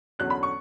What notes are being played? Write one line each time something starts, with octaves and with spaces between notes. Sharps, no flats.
E2 D3 F#3 C#4 F#6
B5
C#6